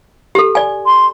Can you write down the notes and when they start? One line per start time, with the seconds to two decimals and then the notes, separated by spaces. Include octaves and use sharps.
0.35 G4 A4
0.55 D5 G#5
0.86 C6